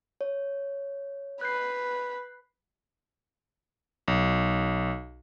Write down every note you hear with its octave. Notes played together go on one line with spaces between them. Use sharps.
C#5
B4 F#6 G6 C7
B1